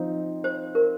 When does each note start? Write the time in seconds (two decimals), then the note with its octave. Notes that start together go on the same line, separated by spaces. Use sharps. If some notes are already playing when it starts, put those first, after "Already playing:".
Already playing: F3 C4 D#4
0.44 C5
0.75 A#4